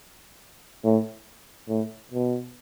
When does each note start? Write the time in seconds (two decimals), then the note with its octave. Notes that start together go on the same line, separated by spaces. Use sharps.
0.84 A2
1.69 A2
2.12 B2